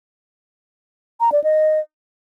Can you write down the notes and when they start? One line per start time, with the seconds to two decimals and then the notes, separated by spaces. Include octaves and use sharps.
1.21 A#5
1.32 D5
1.44 D#5